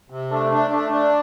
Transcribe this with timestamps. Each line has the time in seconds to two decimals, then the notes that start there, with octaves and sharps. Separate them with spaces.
0.10 C3
0.31 A3 D4
0.52 D4
0.71 A3 D4
0.92 D4